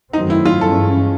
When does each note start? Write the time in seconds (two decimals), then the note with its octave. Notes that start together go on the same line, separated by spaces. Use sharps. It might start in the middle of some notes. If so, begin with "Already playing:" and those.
0.13 F#2 D#3 F#3 A3 C4 D#4
0.30 E4
0.45 F4
0.61 G2 E3 G#3 C#4 A4